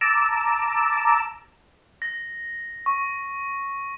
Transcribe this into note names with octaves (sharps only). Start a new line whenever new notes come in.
A5 A#5 D6 E6
A#6
C#6